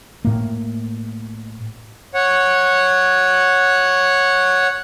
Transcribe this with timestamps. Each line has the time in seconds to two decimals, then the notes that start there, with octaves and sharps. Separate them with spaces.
0.25 A2 A#3
2.14 C#5 F#5